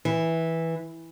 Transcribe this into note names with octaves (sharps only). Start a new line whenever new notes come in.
E3